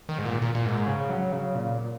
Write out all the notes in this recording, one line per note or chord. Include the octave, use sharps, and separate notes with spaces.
D#3
G#2
A#2
A#2
A#2
G#2
C#3
F#3
C#3
A#2